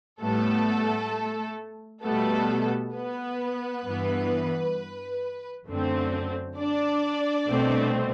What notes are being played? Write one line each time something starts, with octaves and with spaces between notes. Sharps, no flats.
A2 G3 A3 B3 A4
B2 G3 A3 B3 A4
B3 B4
G2 E3 B3
F#2 D3 A3 C4
D4 D5
C2 B2 A3 C4